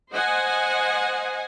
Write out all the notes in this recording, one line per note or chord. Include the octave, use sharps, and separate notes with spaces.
C5 D#5 F#5 G#5